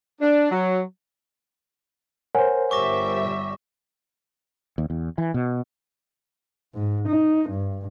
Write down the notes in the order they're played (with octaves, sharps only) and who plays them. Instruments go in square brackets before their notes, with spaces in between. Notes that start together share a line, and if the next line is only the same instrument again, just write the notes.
[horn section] D4
F#3
[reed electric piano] A#4 C5 [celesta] C#5 F#5 G#5
[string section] G1 G3 E5 [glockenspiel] C#6 D6 A#6
[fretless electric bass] D#2
E2
E3
B2
[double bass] G#2
D#4
G2